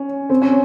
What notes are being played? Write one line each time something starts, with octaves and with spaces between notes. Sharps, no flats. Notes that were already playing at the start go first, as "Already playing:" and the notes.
Already playing: C#4
C4
C#4